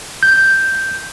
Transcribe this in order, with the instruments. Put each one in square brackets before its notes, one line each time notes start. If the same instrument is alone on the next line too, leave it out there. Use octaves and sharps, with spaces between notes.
[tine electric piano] G6